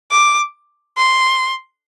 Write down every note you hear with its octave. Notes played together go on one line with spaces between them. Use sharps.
D6
C6